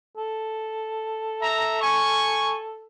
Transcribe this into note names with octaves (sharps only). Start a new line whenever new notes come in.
A4
E5 A#5
G#5 C#6